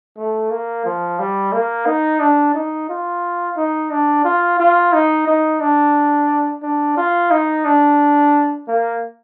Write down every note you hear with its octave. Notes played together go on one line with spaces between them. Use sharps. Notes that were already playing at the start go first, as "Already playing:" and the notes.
A3
A#3
F3
G3
A#3
D#4
D4
D#4
F4
D#4
D4
F4
F4
D#4
D#4
D4
D4
F4
D#4
D4
A#3